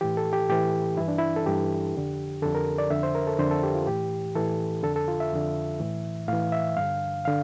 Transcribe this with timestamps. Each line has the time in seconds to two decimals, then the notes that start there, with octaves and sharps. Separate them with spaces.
0.01 A2 E3 G4
0.17 A4
0.33 G4
0.49 A2 E3 G4
0.97 G2 E3 E4
1.08 D4
1.18 E4
1.36 A4
1.46 G2 E3 G4
1.94 F2 D3
2.42 F2 D3 A4
2.55 A#4
2.78 D5
2.90 F2 D3 E5
3.03 C5
3.15 A#4
3.27 A4
3.39 F2 D3 C5
3.51 A4
3.63 G4
3.75 F4
3.87 A2 E3 G4
4.35 A2 E3 A4
4.83 F2 D3 A4
4.96 A4
5.08 F4
5.20 E5
5.32 F2 D3
5.80 A2 E3
6.28 A2 E3 F5
6.52 E5
6.77 G2 D3 F5
7.25 D3 F5